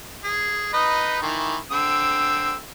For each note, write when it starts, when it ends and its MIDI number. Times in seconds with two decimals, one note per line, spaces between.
0.24 0.72 68
0.73 1.20 63
0.73 1.20 71
0.73 1.20 75
1.22 1.57 51
1.22 1.57 52
1.71 2.54 50
1.71 2.54 60
1.71 2.54 88